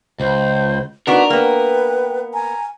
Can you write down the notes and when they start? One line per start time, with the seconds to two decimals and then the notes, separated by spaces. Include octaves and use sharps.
0.20 C#2 C5
1.07 B3 D4 D#4 F#4 A#4 B4
1.30 A#3 B3 B4 G5
2.34 G#5 A#5